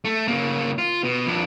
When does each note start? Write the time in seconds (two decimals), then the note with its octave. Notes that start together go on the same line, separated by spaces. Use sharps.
0.05 A3
0.28 C#3 A#3
0.78 F4
1.04 B2
1.27 F2 D4